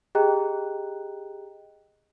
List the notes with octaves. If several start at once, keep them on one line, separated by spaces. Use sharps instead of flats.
G4 G#4 D#5 G5 A#5 F#6